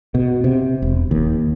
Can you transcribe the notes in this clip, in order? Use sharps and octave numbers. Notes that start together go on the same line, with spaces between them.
B2
C3
E1
D#2